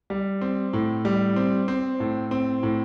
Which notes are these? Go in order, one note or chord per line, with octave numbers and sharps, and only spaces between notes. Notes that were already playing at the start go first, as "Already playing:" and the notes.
G3
C4
A2
G3
C4
C4
A2
C4
A2